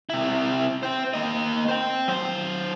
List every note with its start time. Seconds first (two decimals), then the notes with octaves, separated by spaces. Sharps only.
0.10 C3 E4
0.83 C5 G5
1.14 A#3 D#5
1.69 C5 G5
2.08 F#3 C5